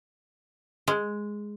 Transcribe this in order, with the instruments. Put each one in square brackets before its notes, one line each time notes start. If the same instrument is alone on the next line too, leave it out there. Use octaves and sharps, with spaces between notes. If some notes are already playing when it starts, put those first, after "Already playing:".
[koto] G#3